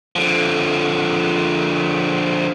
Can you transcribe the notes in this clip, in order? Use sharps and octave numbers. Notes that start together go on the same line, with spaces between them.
D3 F3